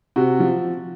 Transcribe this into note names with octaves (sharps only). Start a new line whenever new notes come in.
C3 F#4
F3